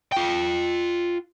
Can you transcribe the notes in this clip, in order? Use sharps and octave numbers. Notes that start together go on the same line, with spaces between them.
F4 G5